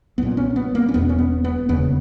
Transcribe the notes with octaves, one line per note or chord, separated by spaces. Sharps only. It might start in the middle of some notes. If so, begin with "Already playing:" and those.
B1 A#2 B3
C#4
B3
A#3
C#4
E1 E2 B2 B3
C#4
B3
B3
E1 D#2 C#3 B3